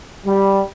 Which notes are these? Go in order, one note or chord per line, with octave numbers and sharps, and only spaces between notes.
G3